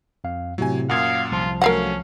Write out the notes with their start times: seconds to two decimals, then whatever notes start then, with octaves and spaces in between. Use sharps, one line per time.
0.24 F2 F5
0.58 A2 C3 F#3 G#5
0.89 F#2 A#2 F5 F#5 D#6 G#6
1.31 C2 F3 F4 A5
1.62 F#3 A3 C#4 A#4 F5 F#5